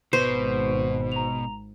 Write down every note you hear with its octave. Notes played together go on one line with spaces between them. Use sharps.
G#1 B2 B4 C5
A#5 F7